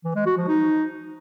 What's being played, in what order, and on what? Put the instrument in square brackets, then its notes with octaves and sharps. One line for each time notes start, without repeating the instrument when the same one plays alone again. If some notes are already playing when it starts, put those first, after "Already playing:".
[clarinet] E3
G#3
F#4
F3
D#4